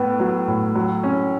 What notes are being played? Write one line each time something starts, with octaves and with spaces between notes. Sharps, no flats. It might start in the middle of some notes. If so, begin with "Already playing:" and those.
Already playing: A2 B3
F#3
A2
F#3
C#4